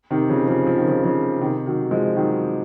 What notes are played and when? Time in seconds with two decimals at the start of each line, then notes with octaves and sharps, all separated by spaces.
0.11 C3 D#3
0.29 C#3 F3
0.48 C#3 F3
0.67 F3
0.78 D#3
0.88 C#3 F3
1.04 C#3 F3
1.41 C3 D#3
1.66 D#3 F#3
1.91 F3 G#3
2.16 D#3 F#3